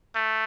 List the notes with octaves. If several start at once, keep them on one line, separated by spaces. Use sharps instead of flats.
A3